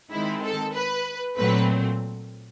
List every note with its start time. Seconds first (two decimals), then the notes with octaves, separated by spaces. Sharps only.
0.12 D#3 G#3 C4 E4
0.44 A4
0.74 B4
1.37 A#2 F#3 A3 C4 B4